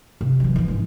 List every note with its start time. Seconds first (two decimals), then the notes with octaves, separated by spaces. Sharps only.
0.21 C3
0.40 E3 F#3
0.56 E3 F3
0.68 G#1 C#4